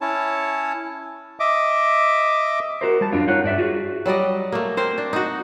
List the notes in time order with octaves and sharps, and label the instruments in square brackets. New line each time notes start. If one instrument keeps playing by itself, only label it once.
[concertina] C#4 E4 C#5 A5
D#5 E5 D6
[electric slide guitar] F#4 A#4 C5
G3 A5
F#2 C4 D4 F4
D#4 F4 C#5 F#5
G2 D5 E5
F4 F#4 G#4
[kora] F#3 G3 D5 D#5
A3 A#3
C4 A#4 C5
D4
D#4 F#4